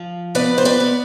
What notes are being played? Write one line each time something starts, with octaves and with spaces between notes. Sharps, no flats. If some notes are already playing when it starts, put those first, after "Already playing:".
Already playing: F3
B3 B4 D5
C5
B4 D5
B3